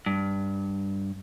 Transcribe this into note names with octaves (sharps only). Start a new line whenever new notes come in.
G2